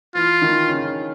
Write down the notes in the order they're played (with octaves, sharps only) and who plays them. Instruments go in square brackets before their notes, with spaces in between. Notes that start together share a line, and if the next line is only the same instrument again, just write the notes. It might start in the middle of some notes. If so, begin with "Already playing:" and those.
[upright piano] E3 [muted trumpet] F4
[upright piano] D#3
C#3